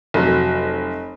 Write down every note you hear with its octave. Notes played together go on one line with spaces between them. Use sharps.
F1 F#3